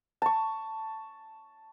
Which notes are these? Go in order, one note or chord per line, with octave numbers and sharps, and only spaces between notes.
A5 C#6